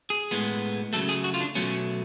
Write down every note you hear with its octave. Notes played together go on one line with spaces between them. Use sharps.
G#4
A2 G#3 B3
C#3 F#3 A3 A4
G#4
F#4
F4
D4
B2 F#3 A3 C#4